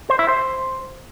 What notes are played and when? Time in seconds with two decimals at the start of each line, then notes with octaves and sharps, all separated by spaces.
0.10 C5
0.19 E4
0.29 C5